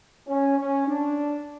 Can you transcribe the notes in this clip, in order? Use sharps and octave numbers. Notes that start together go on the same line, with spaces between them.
C#4
C#4
D4